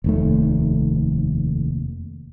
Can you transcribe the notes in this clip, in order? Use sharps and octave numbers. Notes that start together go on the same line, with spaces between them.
F1 D#2 A3